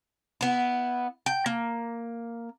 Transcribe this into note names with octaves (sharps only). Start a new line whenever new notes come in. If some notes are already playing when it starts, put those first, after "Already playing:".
B3 E4
G5
A#3